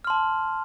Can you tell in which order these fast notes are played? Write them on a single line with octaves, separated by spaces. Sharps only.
F6 C6 A5